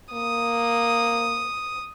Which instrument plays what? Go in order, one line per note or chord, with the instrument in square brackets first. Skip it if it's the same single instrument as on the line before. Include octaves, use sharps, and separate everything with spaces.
[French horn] A#3 [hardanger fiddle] D#6